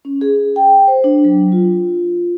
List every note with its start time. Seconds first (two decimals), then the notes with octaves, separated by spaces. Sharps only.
0.05 C#4
0.21 G#4
0.56 G5
0.88 C5
1.04 D4
1.24 F#3
1.52 F4